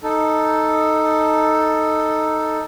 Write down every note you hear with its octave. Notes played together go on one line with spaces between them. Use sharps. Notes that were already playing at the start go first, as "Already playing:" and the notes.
D#4 A4